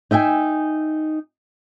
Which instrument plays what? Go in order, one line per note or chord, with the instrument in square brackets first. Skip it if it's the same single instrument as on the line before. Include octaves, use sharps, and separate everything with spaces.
[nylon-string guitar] D#4 E5 G5 G#5